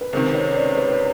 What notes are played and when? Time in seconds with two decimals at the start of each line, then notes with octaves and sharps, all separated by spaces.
0.01 B4
0.13 C#2 C3 D#3 A#4 C5
0.34 B4 C#5
0.55 C5 D5
0.77 B4 C#5
0.89 B4